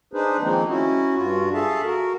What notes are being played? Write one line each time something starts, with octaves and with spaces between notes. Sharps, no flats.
D4 D#4 G#4 B4 C5
D#3 F3 G#3 A#3 C4 D#4
C#4 E4 F#4
G2 F4 F#4
G#4 A4 E5 F5 A5
F#4 A#4